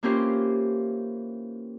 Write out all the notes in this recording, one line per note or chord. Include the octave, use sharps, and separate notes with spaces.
E3 A#3 C#4 F4 G4 C5